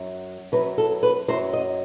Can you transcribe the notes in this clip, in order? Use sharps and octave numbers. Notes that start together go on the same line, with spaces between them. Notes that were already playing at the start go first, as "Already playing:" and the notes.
Already playing: F#2 F#3
F#2 F#3 B4
A4
B4
F#2 F#3 C5
D#5